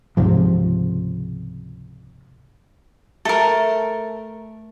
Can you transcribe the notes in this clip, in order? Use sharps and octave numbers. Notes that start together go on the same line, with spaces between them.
C#2 G#2 C3 F3
A3 A4 A#4